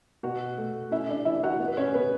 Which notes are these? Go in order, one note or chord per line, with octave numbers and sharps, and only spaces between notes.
B2 F#4 F#5
A3
C#4 E4 E5
D4 D5
E3 E4 E5
F#4 F#5
B3
B4
C#4 C#5
C#3 B3 B4